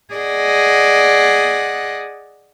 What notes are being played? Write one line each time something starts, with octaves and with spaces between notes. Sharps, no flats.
G#4 D5 D#5 F#5